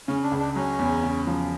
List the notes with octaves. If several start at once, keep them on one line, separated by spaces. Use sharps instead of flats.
C#3 C#4
D4
C#2
D4
F#3 C#4
E2
C#3
F3